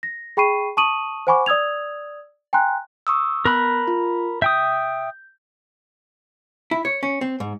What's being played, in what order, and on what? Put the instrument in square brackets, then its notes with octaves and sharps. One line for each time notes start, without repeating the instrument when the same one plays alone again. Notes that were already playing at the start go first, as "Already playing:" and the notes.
[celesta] A#6
G#4 G5 B5 C#6 C7 D#7
A5 C#6 D#6 D#7 F#7
C5 F#5 G#5 B5 C#6 D6
D5 D#6 E6 G#6 F7
G5 G#5 A#5 C6 F#6
[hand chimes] C#6 D#6 E6
[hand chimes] B3 F#6 [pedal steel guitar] A#4 B5
[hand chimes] F4
[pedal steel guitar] E5 G5 D#6 [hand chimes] G6
[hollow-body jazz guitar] E4
C#5
C#4
C4
G#2